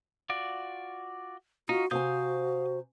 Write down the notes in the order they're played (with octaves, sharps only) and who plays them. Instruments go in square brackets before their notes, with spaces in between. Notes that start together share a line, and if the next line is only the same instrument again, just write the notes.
[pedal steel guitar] F4 F#4 D5
[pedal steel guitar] D#4 [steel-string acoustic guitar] F4 [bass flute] F#4
[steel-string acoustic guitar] C3 C5 G#5 [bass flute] F#4 [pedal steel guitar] F5 D#6 G6